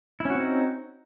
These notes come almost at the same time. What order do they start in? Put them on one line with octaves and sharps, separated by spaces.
E4 C#4 F#4 C4 D#4